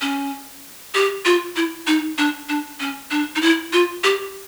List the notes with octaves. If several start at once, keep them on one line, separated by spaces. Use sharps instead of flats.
C#4
G4
F4
E4
D#4
D4
D4
C#4
D4
D#4
E4
F4
G4